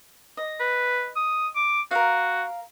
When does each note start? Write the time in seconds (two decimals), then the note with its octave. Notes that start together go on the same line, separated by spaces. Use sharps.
0.37 D#5
0.60 B4
1.16 D#6
1.56 D6
1.91 F#4 A#4 F5